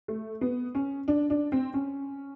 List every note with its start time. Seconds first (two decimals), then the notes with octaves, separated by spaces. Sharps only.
0.08 A3
0.41 B3
0.75 C#4
1.08 D4
1.30 D4
1.52 C4
1.74 C#4